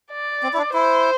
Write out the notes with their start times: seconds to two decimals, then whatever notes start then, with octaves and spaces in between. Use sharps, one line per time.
0.12 D5
0.43 C4
0.54 E4
0.57 D4
0.73 E4 C5